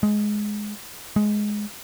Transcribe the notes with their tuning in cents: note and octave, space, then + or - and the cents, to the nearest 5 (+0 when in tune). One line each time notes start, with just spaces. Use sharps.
G#3 +10
G#3 +10